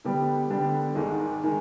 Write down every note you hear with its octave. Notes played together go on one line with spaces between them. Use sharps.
D3 G3 B3 D4 G4
D3 G3 B3 D4 G4
G#1 G#2 D#3 G#3
D#3 G#3